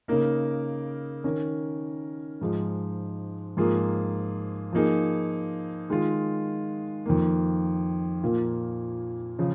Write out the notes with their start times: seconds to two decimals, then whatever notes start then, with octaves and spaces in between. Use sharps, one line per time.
0.08 C#3 A#3 D#4 A#4
1.24 D#3 C#4 A#4
2.41 G#2 F3 G#3
3.57 G#2 F3 A#3 F4 G#4
4.73 F3 A#3 D#4 G#4
5.90 D#3 G#3 F4
7.06 F2 D#3 A#3
8.22 A#2 F3 A#3 F4
9.39 C#3 F3